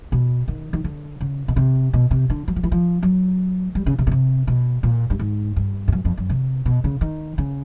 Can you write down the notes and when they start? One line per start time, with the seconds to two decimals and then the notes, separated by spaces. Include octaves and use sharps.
0.12 B2
0.48 D#3
0.73 D#3
0.84 D3
1.21 C#3
1.48 B2
1.56 C3
1.93 B2
2.11 C3
2.30 D3
2.48 F#3
2.56 F3
2.63 E3
2.72 F3
3.03 F#3
3.75 G3
3.86 C#3
3.99 C3
4.07 B2
4.11 C3
4.47 B2
4.83 A#2
5.10 G2
5.19 G#2
5.56 G2
5.88 F2
5.92 F#2
6.05 F2
6.17 F#2
6.30 C3
6.65 B2
6.84 C#3
7.01 D#3
7.38 C#3